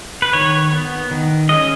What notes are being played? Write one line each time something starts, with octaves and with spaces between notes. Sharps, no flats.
B4
D#3 C#5
B3
D#3
G#3 C#4 D#5